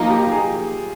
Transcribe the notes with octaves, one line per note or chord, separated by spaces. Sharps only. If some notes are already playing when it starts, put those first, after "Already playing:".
Already playing: F3 A#3 D#4 F4
G4
G#4